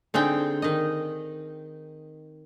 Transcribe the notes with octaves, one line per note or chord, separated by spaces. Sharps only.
D3 C4 D#4 G#4 G5
D#3 D#5